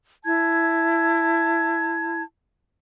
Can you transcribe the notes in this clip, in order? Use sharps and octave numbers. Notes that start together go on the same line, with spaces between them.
E4 A5 G#6